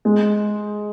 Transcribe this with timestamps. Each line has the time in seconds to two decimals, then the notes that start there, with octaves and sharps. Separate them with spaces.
0.05 G#3